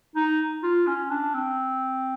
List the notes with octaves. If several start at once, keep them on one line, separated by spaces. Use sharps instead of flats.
D#4
F4
C#4
D4
C4